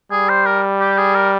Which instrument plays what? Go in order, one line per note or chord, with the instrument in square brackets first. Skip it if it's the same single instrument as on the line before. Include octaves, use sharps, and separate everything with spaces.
[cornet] G3 [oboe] G#4
[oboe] C5
A#4
G4
G#4
A#4